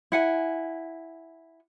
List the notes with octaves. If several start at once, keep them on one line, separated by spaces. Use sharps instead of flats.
E4 F#5 G#5